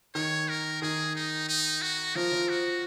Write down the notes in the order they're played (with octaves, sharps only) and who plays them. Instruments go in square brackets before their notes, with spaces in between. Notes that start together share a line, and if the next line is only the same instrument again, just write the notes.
[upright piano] D#3 [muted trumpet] C#5
[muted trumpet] A#4
[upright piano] D#3 [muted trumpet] G#4
[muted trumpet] D#4
D#4
F#4
[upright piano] F3 [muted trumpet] A#4
[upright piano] F3
[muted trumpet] F#4